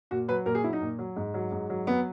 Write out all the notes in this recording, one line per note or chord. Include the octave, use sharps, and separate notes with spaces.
A#2 F#4
F#3 B4
A#2 A#4
G#4
F#3 E4
D#4
A#2
F#3
G#2
F#3
G#2
F#3
F#3 B3